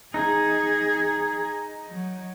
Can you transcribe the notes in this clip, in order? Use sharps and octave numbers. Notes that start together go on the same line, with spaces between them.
D#4 G#4
F#3